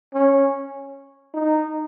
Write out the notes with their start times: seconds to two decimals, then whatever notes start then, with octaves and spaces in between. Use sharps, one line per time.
0.14 C#4
1.34 D#4